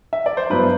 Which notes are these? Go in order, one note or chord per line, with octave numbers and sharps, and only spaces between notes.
E5
D5
C5
G2 F#3 B3 E4 B4